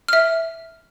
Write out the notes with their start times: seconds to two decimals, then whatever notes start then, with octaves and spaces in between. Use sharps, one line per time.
0.08 E5 F6